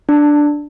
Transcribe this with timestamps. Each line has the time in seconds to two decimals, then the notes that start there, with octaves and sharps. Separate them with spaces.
0.09 D4